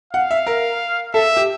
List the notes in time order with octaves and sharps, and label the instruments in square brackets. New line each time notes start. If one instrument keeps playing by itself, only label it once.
[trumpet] F5 [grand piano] F#5
[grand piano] E5
A#4
[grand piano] A4 [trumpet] E5
[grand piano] G4